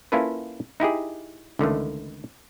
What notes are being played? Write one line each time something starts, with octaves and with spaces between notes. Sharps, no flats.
A#3 C#4 E4 F4 A4 B4
D#4 E4 G4 G#4
C#2 D3 D#3 A3